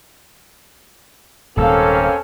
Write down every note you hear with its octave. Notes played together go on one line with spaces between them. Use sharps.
D#1 D#2 G#2 A#3 C4 C#4 A4 F5